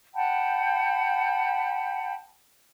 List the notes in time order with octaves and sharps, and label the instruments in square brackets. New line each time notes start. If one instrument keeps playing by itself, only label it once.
[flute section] F#5 G5 A5 B5